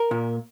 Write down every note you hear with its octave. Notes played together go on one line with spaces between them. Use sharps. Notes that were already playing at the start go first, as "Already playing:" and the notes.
Already playing: A#4
A#2